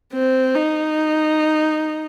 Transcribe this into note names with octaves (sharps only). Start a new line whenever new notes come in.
C4
D#4